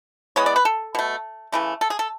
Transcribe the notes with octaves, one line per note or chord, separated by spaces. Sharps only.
E3 G#3 B3 C#5
D5
B4
A4
B2 A3
C#3 E3 A3
A4
G#4
A4